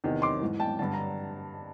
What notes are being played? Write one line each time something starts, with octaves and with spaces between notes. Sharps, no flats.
E2 C3 D#3
C6 D6
G#2 E3
G5 A5
G2 D3 A5
A#5